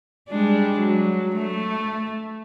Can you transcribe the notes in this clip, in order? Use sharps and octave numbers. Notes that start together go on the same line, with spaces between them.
G3 G#3 D4
F#3
A3